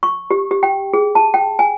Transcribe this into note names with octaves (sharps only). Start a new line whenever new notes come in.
C#6
G4
G4
G5
G#4
A5
G5
G#5